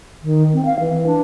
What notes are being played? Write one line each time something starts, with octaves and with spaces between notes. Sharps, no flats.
D#3
C4
F5
E3
D4